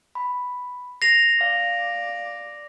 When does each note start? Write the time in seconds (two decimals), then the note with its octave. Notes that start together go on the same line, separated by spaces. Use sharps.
0.15 B5
1.02 A#6 C7 F7
1.41 D5 F5